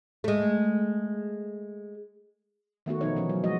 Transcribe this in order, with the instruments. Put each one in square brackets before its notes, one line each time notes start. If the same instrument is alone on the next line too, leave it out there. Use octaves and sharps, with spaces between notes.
[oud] G#3 A3
[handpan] D#3 A3 B3 F#4
B2 F3 D#4 C#5
E3 F3 C#4
F#3
F3 G#3 F#4 D#5